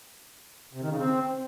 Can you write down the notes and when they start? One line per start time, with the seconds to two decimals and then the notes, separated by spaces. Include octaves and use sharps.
0.73 C3
0.82 D#3
0.91 C#3
0.99 C4